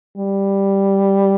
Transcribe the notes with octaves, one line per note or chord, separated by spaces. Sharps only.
G3